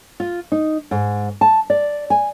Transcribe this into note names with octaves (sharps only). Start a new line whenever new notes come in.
F4
D#4
G#2
A5
D5
G#5